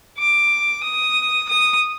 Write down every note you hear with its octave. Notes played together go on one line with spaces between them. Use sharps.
D6
D#6
D#6